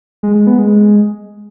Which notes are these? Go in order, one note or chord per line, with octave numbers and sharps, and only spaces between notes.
G#3
G#3
B3
G#3